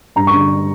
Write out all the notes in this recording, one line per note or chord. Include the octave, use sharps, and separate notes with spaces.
G2 A#5
C#6
D3